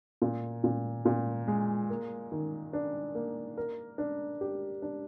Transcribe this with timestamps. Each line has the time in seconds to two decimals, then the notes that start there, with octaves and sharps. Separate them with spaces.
0.22 A#2
0.64 A#2
1.05 A#2
1.48 G#3
1.90 A#3
2.32 D#3
2.73 D4
3.15 A#3
3.57 A#4
3.98 D4
4.41 G4
4.82 D4